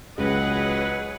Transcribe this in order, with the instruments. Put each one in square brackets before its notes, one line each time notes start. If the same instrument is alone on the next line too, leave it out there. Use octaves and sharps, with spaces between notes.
[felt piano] C#2 [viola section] F#3 G#4 B4 [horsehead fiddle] D#5 F#5